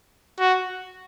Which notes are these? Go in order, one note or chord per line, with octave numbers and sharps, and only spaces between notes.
F#4